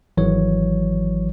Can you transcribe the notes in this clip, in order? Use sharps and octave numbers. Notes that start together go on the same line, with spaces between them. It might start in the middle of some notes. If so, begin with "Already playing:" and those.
G#1 E3 F#3 C#5